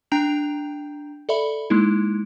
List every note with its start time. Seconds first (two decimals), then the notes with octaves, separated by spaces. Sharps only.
0.12 D4 G5 A#5 G6 D7 F7
1.29 A4 D5 E5 B5
1.70 G#3 A#3 D#4 E4